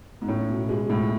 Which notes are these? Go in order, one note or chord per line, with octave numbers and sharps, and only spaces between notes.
G#2
A2 C#4
B2
G#3
C#2 A2